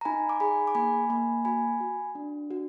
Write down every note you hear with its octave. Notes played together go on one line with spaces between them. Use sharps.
A#5
D#4 G#5 B5
D6
G#4 G#5 B5
D6
A#3 G#5 B5
A#3 G#5 B5
F#4 G#5 B5
F#4
D4
F#4